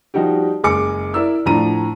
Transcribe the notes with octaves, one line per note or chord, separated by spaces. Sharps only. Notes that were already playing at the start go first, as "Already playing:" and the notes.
F3 G3 D#4 F#4 G4
F#1 G#3 G#5 D6 C#7
E4 A#4 D5 E6
A2 F3 D4 A#5 D#7